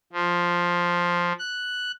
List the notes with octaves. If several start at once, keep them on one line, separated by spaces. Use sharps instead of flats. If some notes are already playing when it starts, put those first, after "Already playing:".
F3
F#6